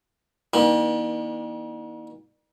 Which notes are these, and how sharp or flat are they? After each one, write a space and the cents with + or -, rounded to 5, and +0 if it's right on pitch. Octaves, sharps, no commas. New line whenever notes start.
E3 -45 A#3 +40 D4 +45